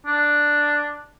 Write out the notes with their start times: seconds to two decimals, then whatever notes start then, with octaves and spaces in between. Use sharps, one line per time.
0.06 D4